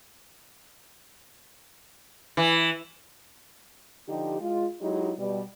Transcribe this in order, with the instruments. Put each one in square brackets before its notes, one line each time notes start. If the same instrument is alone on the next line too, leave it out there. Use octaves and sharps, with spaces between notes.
[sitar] E3
[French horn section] D3 F3 D#4 G4
G#3 F4
F#3 G#3 D#4 E4 G4
B2 G3